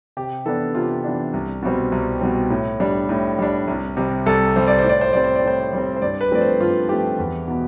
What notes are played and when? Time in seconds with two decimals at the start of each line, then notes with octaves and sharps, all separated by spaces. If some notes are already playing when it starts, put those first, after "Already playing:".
0.17 C3 G4
0.45 E3 B3 D4 A4
0.75 C3 F4
1.04 E3 B3 D4
1.34 C2
1.63 B2 G3 C4
1.92 C2
2.21 B2 G3 C4
2.50 A2
2.80 G3 D4
3.09 A2
3.39 G3 D4
3.68 C2
3.97 C3 G3
4.26 C2 A4
4.56 C3 G3 C5
4.67 D5
4.78 C5
4.84 A2
4.90 D5
5.01 C5
5.13 G3 C4 D5
5.24 C5
5.36 D5
5.43 A2 C5
5.73 G3 C4
5.97 C5
6.02 G2 D5
6.21 B4
6.31 F3 A3 C4 D5
6.41 C5
6.60 G2 F4
6.89 F3 A3 C4 G4
7.18 E2
7.48 B2 B3